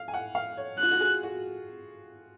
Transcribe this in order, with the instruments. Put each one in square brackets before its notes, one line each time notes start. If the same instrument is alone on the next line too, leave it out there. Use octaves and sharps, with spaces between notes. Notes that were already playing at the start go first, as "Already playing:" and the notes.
Already playing: [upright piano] F5
G#5
F#5
F5
C#5
[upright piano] F4 [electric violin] F#6
[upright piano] F#4
G#4
F#4